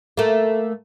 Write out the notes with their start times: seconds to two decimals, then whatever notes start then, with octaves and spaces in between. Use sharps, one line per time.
0.17 A3 A#3